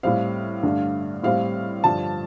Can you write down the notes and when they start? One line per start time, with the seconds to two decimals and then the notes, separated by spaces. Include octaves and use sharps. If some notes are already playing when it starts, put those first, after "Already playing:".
0.03 A2 G3 C4 F5
0.63 G2 D3 A3
1.23 A2 G3 C4 F5
1.84 G2 D3 F3 A5